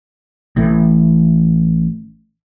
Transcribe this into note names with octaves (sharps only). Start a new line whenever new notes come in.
A1 A2 E3